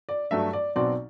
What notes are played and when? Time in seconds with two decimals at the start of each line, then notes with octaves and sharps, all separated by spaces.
0.09 D5
0.31 G2 F#3 A3 D4 E5
0.53 D5
0.76 B1 B2 F#3 C4 D5